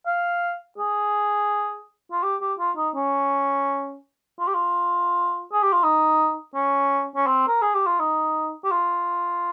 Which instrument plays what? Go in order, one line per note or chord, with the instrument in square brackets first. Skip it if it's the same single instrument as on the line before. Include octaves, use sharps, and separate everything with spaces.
[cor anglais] F5
G#4
F4
G4
G4
F4
D#4
C#4
F4
G4
F4
G#4
G4
F4
D#4
C#4
C#4
C4
A#4
G#4
G4
F4
D#4
G4
F4